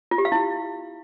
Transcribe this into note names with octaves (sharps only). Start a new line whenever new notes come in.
F4
G4
F5
E4